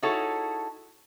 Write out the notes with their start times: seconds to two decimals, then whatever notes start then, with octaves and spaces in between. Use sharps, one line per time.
0.02 D#4 E4 F#4 G#4 A4 C#5